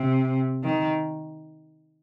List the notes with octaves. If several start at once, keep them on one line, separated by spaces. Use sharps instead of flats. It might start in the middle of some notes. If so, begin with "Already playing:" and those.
Already playing: C3
D#3